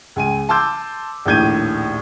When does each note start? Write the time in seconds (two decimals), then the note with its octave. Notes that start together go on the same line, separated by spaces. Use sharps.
0.16 C#2 G#5 D#7
0.49 A5 C6 D6 E6 G6
1.25 A#1 D#2 A2 G6 G#6 D#7